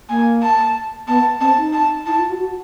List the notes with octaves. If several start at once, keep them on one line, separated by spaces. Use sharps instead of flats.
A#3 G#5
A5
B3 A5
C4 A5
D#4
A5
E4 A5
F4
F#4
F#4